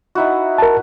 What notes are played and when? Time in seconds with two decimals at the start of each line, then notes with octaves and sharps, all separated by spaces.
0.15 D#4 E4 F#4
0.58 A#4 A5